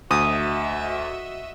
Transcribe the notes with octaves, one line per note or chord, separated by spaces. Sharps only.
D2 F#4 D#5 E5 D#6